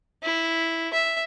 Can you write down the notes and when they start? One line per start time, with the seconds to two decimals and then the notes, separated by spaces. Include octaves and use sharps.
0.23 E4
0.93 E5